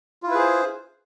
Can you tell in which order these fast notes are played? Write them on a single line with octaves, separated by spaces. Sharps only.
F4 E4 B4 G#4 C5